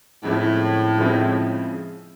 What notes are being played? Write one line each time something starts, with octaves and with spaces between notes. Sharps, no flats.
A2 C#3 F3 G#3 C4 E4
C#3 F3 G#3 C4 E4